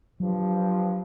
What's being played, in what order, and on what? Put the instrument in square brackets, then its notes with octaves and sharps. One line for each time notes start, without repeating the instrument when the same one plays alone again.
[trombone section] G2 F3 [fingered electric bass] F#3